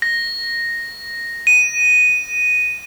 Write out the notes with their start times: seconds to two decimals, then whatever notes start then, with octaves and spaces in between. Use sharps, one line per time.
0.02 A#6
1.47 D#7